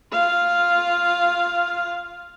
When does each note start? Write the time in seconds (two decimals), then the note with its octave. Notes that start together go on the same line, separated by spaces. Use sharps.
0.12 F4 F5